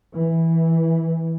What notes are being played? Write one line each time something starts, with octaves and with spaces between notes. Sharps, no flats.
E3